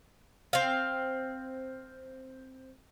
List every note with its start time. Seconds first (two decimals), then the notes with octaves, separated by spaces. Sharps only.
0.53 C4 F5